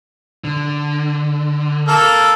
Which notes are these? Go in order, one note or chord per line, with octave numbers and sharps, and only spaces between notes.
D3
A#3 A4